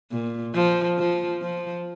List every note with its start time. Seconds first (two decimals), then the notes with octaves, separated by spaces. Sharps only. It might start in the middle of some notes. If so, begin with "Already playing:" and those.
0.11 A#2
0.55 F3
0.98 F3
1.41 F3